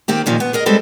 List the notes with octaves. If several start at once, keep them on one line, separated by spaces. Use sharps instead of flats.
D#3 A#3 C4 G4
F2 A#2 D#3 F3
B3
G#4 A#4 D#5
G3 G#3 C4 G#4 A4 B4